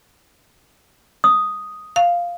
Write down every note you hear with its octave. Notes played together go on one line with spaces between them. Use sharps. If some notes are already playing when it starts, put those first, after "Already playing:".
D#6
F5